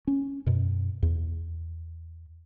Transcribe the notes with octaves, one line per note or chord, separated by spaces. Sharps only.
C#4
F#2 B2
E2